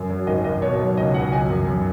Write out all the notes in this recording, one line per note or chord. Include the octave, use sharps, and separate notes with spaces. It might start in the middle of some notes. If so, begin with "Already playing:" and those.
Already playing: F#2
F#3
G#1 D#5
G#1 D#5
B2 C#5
F#3
C#2 D#5
C#2 F#5
F#3 G#5
F#2
F#2